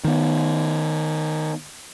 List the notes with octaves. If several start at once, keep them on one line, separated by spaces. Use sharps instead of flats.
D#3 B3